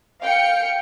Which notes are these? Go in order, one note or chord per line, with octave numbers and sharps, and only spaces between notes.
F5 G5 C#7